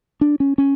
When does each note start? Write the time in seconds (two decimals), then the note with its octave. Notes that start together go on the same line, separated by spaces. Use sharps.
0.21 D4
0.40 C#4
0.58 C#4